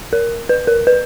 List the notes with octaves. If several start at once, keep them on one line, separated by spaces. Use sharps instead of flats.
A#4
B4
A#4
B4